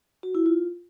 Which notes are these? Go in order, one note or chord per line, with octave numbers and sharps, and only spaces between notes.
F#4
E4
F4